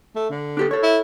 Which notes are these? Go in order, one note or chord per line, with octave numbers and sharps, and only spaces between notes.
A3
D3
D4 G4 A4
A4 C#5
E4